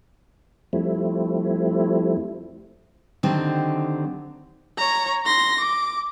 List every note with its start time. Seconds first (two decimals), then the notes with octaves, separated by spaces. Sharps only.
0.73 F2 F3 G3 A3 C4 E4
3.23 D3 D#3 F#3 C4 G4
4.78 C#5 A#5
5.26 C6 A#6
5.60 D6